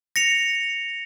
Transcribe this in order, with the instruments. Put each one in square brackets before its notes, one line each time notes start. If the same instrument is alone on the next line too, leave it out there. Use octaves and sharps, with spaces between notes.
[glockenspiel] A#6 C#7 F7